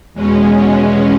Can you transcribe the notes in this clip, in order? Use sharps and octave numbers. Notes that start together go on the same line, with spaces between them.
E2 B2 G#3 C#4